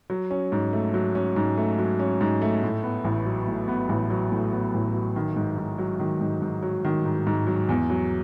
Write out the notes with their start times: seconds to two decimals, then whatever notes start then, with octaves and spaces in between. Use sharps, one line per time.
0.10 F#3
0.31 C#4
0.52 G#2
0.73 A3
0.94 F#3
1.15 C#4
1.36 G#2
1.58 A3
1.78 F#3
1.99 C#4
2.21 G#2
2.42 A3
2.63 A2
2.83 B3
3.05 A1
3.25 F#3
3.48 A2
3.68 B3
3.89 A1
4.10 F#3
4.32 A2
4.52 B3
4.74 A1
4.95 F#3
5.16 D#3
5.36 G#2
5.58 G#2
5.78 F#3
6.00 D#3
6.21 G#2
6.42 G#2
6.63 F#3
6.85 D#3
7.05 G#2
7.27 G#2
7.47 F#3
7.69 E2
7.90 F#3